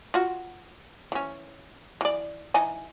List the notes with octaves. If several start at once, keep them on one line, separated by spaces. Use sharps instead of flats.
F4 F#4
E3 C#4
E3 D5
E3 D#4 G#5